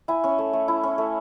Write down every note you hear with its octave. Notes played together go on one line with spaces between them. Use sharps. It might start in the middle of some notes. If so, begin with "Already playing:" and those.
E4 G#5
C#4
A3
A3
E4
C#4
A3